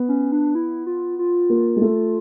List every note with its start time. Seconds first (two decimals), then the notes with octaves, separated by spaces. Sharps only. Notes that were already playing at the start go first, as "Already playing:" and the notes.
Already playing: B3
0.08 C#4
0.32 D4
0.55 E4
0.87 F4
1.19 F4
1.50 A#3
1.76 G#3
1.82 A3